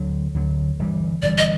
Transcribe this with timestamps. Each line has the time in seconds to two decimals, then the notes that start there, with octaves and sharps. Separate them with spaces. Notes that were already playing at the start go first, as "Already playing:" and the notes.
Already playing: D2 D3 F#3
0.34 D2 D3 F#3
0.79 G1 G2 E3 G3
1.22 G1 G2 E3 G3 D5
1.38 D#5